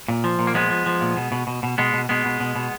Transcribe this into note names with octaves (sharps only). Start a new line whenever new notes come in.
A#2
F3
A#2
A#3
F3 G#3 B3
F3
F3
A#2
B2
B2
B2
B2
B2 G#3 B3
B2
B2 G#3 B3
B2
B2
B2